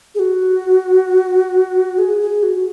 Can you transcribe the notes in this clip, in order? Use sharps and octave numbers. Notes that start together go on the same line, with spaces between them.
G#4
F#4
G#4
G#4
F#4
F#4